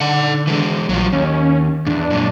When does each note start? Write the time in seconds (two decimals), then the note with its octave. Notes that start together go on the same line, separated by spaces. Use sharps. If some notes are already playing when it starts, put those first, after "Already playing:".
0.01 D3 D#4 F#5
0.47 E3 G#3
0.89 A#1 F3 F#3
1.13 D#2 C#4
1.87 E2 G#2 D4
2.10 F#2 A#2